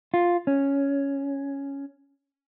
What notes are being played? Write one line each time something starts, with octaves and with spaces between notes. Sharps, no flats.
F4
C#4